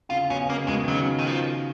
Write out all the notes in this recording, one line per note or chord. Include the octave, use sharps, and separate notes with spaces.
C#3 F4
B2 C#4
C#3 A#3
B2 G#3
D#3
C#3 F#3
D#3
F3